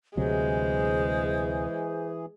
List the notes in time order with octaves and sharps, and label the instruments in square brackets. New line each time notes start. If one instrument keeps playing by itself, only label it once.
[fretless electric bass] D2 C3 F#3 [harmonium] E3 G#4 [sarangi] G#3 [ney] C5